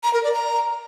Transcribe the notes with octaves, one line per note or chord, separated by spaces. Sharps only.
A#5
A#4
D5
A#5